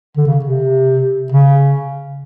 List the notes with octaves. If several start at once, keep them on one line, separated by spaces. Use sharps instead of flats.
D3
C#3
C3
C#3